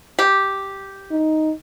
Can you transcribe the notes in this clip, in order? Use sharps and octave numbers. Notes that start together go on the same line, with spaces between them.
G4
D#4